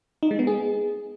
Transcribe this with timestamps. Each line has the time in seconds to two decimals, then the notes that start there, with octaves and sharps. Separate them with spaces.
0.23 D#4
0.31 G#3
0.39 B3
0.47 G#4